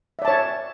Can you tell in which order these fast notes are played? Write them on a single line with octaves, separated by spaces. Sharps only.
E5 D5 A5 C#5